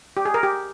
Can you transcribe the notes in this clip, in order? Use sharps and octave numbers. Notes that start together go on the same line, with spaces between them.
G4
G#4
A#4
G4